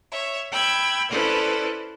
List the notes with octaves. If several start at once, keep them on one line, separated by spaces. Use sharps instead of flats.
C#5 E5
G5 B5 E6 G#6
C#4 E4 A4 B4 C5 D5